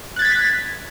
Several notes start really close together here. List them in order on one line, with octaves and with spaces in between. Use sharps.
F#6 A6 G#6 B6